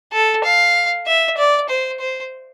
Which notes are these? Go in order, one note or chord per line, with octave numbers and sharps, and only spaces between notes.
A4
F5
E5
D5
C5
C5